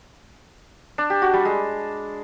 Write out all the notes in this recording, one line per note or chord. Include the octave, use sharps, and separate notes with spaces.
D4
G4
F#4
G3
G#3